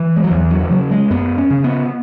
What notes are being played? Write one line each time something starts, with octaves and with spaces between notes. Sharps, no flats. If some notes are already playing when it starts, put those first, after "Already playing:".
Already playing: E3
G#3
F#3
E2 E3
F#3
E3
C#3 F#3
G#3
F#2 B3
C#4
C#3
B3